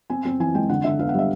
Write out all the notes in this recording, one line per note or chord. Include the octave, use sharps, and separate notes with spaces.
C4 G#5
C4
E3 G#5
G#3 G5
D3 F#5
D3 E5
B3 F5
F#5
G3 E5